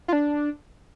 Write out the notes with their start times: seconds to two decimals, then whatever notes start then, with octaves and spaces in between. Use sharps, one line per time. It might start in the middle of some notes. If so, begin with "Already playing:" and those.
0.08 F4
0.13 D4